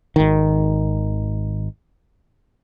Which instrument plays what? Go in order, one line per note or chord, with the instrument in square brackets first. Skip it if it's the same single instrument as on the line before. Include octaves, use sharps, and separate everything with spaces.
[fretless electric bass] G#1 D#3